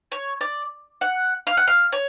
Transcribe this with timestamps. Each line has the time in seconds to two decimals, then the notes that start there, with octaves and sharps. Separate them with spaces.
0.12 C#5
0.41 D5
1.01 F#5
1.47 F5
1.57 F#5
1.67 F5
1.92 C#5